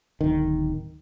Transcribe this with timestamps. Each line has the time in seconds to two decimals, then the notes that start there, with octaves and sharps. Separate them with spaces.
0.21 D1 D#3